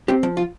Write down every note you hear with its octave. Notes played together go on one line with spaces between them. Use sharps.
C4 G4
F3
F4